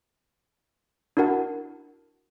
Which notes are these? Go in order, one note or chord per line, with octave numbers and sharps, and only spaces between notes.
D4 E4 F#4 A#4 F#5 A5